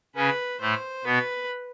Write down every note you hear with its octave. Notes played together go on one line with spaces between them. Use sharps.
C#3 C#4 B4
A2 A3 C5
B2 B3 B4